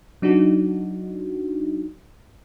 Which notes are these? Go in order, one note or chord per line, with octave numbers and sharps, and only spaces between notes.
F#3 D4 D#4 F#4